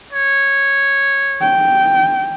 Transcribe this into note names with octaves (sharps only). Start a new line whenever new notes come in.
C#5
G5